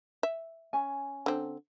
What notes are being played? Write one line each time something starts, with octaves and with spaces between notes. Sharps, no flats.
E5
C#4 G#5
D3 C4